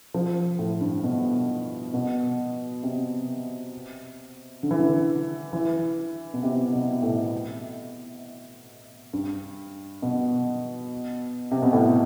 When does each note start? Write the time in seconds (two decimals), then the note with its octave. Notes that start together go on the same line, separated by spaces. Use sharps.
0.14 F3
0.59 A2
0.81 G2
1.04 B2
1.94 B2
2.83 C3
4.63 D3
4.71 E3
4.79 D3
5.53 E3
6.33 B2
6.43 C3
6.73 B2
7.03 A2
9.13 G2
10.02 B2
11.51 C3
11.62 B2
11.73 A2